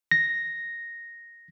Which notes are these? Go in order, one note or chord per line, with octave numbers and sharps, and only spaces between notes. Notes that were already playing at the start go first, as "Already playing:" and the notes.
A#6